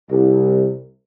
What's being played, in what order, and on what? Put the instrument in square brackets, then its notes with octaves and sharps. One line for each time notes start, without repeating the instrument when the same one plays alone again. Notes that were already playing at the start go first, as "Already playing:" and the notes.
[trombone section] C2